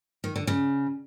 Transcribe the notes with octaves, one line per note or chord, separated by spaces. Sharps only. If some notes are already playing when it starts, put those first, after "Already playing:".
D#3
D3
C#3